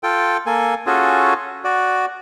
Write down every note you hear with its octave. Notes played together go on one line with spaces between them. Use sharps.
F4 A4 G5
A#3 A4 G#5
C#4 F4 F#4 G#4 A4
F#4 D5